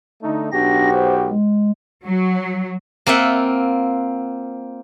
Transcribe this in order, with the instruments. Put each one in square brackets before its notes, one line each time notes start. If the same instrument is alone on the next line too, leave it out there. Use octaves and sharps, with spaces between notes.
[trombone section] D3 A3 D#4
[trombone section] B1 F#4 G4 [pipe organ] D4 A#6
[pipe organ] C5
G#3
[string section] F#3
[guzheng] A#3 C4 F4 E5 F#5